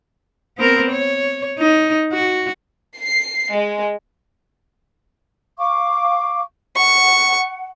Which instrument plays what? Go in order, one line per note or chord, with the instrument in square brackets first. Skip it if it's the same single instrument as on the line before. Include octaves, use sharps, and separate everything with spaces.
[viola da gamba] B3 C4 A#4
C#5
D#4
F#4
[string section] C7
G#3
[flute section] F5 C#6 D6
[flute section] F#5 [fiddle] C#6